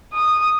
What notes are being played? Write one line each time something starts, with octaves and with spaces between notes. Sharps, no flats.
D#6